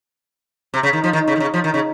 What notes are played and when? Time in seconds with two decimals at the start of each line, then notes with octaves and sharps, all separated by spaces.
0.74 C3
0.83 C#3
0.93 D#3
1.04 F3
1.13 D#3
1.28 C#3
1.36 D#3
1.40 C#3
1.54 F3
1.64 D#3
1.74 C#3